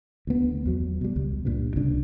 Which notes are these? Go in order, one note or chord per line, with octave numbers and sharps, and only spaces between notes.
D2 B3
E2 F#3
B2 G3
C#2
G2 A#2
C2 C#3 D4